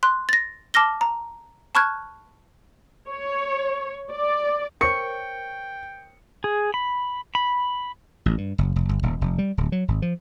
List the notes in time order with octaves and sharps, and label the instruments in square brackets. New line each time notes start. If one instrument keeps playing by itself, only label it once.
[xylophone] C6 F#6
A6 A#6
A5 D6 F6 A#6 G7
A#5
A5 B5 C#6 F6 F#6 G#6
[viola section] C#5
D5
[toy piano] A#4 C5 C#5 [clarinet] G5 [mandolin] C#6 [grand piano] C#7
[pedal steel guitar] G#4
B5
B5
[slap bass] A1
G2
F#1
F1
G1
D#1
F1
G3
D1
F#3
G#1
F3